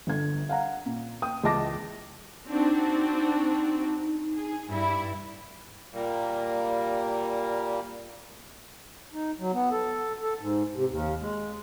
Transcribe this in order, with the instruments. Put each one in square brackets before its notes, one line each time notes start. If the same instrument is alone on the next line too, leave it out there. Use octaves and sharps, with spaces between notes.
[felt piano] G1 D3 G#6
F5 F#5 A#5
A#2
G5 D#6
C#2 E3 D#5 A5 D6 A#6
[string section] C4 D4 F#4 [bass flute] D#4
[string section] G#4
G2 E4
[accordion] A#2 G3 A#3
[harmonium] D#4
F#3
B3
A4
A4
G#2
C3
D#2
G#3